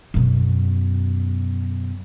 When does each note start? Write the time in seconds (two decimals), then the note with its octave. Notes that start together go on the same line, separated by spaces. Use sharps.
0.14 F#2 B2